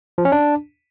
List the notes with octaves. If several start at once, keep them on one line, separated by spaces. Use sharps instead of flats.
F3
C#4
D4